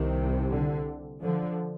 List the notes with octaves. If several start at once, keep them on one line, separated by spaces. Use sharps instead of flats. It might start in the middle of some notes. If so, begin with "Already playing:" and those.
Already playing: C2 C3 D#3
D3
D3 F3